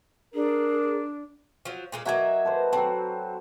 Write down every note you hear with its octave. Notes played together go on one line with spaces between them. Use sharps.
D4 G#4 A#4
F3 F#3
A#2 G#3 A#3
F#3 A#3 F#4 D#5 E5 G#5
A4 B4 C5
F#3 C4 A4